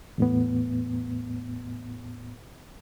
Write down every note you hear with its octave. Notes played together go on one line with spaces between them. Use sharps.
E2 A2 B3